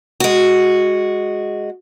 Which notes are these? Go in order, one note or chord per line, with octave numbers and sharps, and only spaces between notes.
G#3 F#4